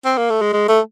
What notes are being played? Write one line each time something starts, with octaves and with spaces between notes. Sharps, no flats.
C4
A#3
A3
G#3
G#3
A3